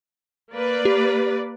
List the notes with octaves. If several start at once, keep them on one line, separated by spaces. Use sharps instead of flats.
A#3 B4 D5
G4